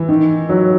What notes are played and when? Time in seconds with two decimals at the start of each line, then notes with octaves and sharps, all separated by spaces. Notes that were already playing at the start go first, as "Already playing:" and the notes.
Already playing: E3
0.09 D#3
0.49 F#3